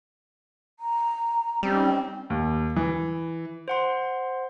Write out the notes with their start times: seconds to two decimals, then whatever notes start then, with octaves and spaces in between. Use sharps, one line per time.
0.80 A#5
1.63 G3 C4 C#4 D#4
2.30 D#2
2.76 E3
3.68 C5 F#5 C6